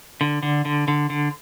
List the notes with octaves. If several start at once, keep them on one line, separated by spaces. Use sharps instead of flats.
D3
D3
D3
D3
D3